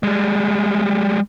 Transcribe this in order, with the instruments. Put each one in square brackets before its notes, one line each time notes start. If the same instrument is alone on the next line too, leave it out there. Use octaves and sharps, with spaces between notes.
[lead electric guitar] G3 G#3